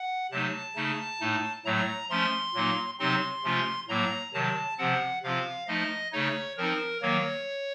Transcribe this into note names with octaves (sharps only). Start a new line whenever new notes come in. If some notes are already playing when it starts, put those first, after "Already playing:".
Already playing: F#5
C3 F#3 A3 D#4 A5
C#3 A3 D#4
A2 A3 D#4
A2 F#3 A3 A#5
F3 A3 C#4 C6
A#2 F#3 A#3 D#4
C3 F#3 C4 D#4 C6
C3 F3 A3 C#4 F4
A2 F#3 A#3 A#5
C3 D#3 F#3 A5
C3 F3 C4 F#5
C3 F3 C4 F4 F5
F3 A3 D#4 D#5
C#3 A3 D#4 C#5
F3 C4 D#4 A#4
D#3 F#3 A#3 C#5